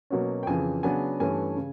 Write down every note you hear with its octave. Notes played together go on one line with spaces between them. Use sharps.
B2 F#3 A#3 C#4
G5
F2 C#3 E3 G#5
C#3 F#3 B3 D4 G#5
G2 E3 A3 C#4 G#5
C#3